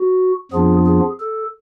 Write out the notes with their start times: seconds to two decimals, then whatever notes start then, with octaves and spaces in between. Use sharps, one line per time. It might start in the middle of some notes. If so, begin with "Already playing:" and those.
Already playing: F#4
0.51 F2 F3 B3 D4 F4 G#4
0.86 G#4
1.20 A4